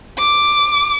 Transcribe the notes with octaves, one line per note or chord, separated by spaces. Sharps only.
D6